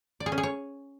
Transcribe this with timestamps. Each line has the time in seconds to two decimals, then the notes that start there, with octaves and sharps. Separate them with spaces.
0.20 D5
0.26 G#4
0.32 C#4
0.38 G#4
0.43 C#5